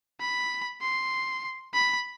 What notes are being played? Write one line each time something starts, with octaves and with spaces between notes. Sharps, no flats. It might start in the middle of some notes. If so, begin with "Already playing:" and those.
B5
C6
B5